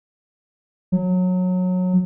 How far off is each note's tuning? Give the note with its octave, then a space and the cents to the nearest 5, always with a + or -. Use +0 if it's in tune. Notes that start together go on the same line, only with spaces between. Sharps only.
F#3 -20